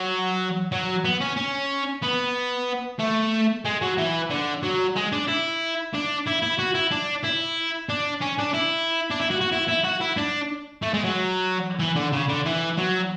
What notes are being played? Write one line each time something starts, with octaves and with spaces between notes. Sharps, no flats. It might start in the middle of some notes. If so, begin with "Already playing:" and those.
Already playing: F#3
F#3
B3
C#4
C#4
B3
A3
G#3
F#3
E3
D3
F#3
G#3
D4
E4
D4
E4
E4
F#4
E4
D4
E4
D4
C#4
D4
E4
D4
E4
F#4
F#4
E4
E4
F#4
E4
D4
A3
G#3
F#3
E3
D3
C#3
D3
E3
F#3